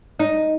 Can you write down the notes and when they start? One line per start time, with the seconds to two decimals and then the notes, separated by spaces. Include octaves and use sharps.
0.19 D#4